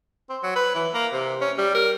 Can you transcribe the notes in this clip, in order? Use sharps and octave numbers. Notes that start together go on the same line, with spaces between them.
C4
F#3
B4
E3
A#3
C3
C#4
G3
A#4